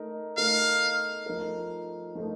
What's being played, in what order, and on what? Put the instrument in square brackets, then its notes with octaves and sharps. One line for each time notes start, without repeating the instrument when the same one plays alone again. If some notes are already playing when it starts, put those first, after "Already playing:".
Already playing: [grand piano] A3 D#4 A#4
[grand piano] A3 D#4 A#4 [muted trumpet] F5
[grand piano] F3 A3 D#4 A#4
F3 A3 D#4 A#4